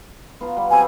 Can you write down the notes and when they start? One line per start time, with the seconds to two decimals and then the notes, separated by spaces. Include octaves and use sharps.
0.41 B3 F4 A#5
0.57 G3 B3
0.71 F#3 G3 C4 G#5